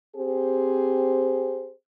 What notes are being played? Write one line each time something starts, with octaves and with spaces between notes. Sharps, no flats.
C4 G4 G#4 C5